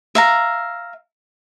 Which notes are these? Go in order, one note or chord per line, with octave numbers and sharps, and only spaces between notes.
E5 F5 A#5